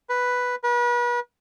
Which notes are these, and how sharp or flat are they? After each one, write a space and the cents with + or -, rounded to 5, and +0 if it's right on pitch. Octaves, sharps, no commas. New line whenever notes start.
B4 +0
B4 -40